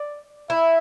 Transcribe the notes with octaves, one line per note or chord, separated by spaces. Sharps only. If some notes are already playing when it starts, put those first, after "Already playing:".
Already playing: D5
E4 E5